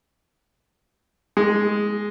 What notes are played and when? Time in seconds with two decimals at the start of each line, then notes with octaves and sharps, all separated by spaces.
1.37 G#3